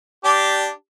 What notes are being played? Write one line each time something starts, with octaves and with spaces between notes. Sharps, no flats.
D4 G4